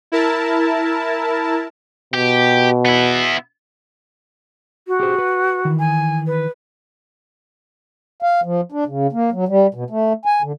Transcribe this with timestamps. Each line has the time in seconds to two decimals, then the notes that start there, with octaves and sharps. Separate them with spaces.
0.12 E4 A#4 A5
2.14 B2 G4
2.85 B3 E4
4.88 F#4
5.00 G4 G#4 C5
5.18 B4
5.65 D#3 E3
5.79 G#5
6.27 B4
8.22 F5
8.43 F3
8.72 D4
8.87 C#3
9.13 A#3
9.32 F#3
9.48 G3
9.74 B2
9.90 A3
10.25 G#5
10.42 D3